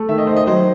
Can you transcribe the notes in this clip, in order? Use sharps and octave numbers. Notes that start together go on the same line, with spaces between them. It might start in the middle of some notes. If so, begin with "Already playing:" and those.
Already playing: A3
D#3 E5
D#5
D#3 C5
D#5
F#3 C5